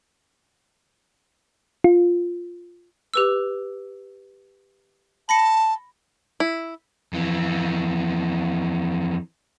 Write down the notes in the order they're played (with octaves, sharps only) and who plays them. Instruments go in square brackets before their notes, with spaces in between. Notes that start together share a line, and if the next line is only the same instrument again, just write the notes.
[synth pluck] F4
[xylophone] G4 B4 E6
[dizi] A5 [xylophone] B5 A#6 C#7
[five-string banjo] E4
[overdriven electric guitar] F2 E3